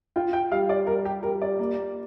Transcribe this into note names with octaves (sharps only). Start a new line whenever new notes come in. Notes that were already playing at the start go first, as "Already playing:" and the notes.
F4 G5
G5
G3 F5
D5
G3 A#4
G4
G3 A#4
D5
A#3